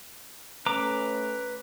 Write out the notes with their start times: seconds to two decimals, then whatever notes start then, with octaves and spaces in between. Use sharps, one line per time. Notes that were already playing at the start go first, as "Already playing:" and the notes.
0.66 A3 C#4 B4 A#5 D6